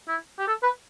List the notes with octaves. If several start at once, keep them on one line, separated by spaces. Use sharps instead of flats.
E4
G4
A4
B4